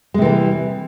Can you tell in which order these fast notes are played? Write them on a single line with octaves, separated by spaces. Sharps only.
G#3 C3 E3 A#3 G3